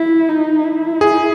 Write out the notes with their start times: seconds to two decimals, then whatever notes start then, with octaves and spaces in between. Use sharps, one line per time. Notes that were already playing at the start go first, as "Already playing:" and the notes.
Already playing: E4
0.29 D#4
0.64 E4
1.01 G#4